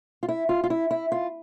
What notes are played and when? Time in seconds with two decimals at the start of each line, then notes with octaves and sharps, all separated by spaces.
0.23 F4
0.29 E4
0.49 F4
0.64 F4
0.70 E4
0.91 E4
1.12 F4